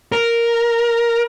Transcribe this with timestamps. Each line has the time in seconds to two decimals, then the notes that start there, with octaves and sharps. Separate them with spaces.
0.12 A#4